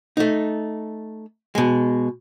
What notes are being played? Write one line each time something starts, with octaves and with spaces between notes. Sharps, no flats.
A3 D#4
B2 G#3